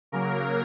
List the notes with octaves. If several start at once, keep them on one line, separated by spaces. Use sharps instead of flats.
C#3 F#3 A#3 A#4